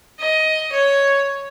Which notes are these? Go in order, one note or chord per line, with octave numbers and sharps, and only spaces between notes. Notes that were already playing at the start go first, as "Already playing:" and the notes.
D#5
C#5